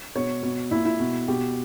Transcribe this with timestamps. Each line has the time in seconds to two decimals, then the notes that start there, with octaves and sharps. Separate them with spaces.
0.15 B2 C#5
0.43 B2
0.71 A#2 E4
0.85 E4
1.00 B2
1.28 B2 G4